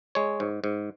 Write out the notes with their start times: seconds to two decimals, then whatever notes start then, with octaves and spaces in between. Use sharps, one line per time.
0.15 G#3 C#5
0.40 G#2
0.64 G#2